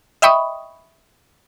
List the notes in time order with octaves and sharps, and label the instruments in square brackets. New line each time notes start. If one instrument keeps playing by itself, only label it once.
[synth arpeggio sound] D#5 E5 G5 B5 C#6 D#6